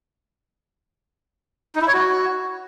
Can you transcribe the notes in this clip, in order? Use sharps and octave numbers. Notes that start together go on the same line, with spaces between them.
D#4
E4
C#5
F#4